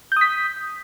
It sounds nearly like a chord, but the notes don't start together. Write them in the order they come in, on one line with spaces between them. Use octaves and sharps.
G6 D#6 B6